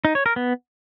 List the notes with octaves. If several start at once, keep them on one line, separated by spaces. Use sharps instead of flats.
D#4
C#5
A#4
B3